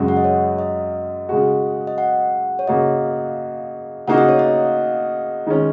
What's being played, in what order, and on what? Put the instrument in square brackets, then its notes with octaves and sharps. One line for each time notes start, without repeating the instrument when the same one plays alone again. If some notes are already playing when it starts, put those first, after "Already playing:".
Already playing: [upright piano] F#2 C#3 G#3 F#4
[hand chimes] F#5
D#5
C#5
D#5
[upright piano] C#3 G#3 F#4
[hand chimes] D#5
F#5
C#5
[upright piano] C#3 A#3 F#4 [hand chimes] D#5
[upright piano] C#3 A#3 D#4 F#4 [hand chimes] F#5
[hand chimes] D#5
C#5
D#5
[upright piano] D#3 G#3 C#4